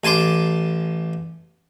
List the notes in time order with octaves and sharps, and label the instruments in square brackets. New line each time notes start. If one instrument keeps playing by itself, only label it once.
[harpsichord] A1 G#5 A5 C6 D6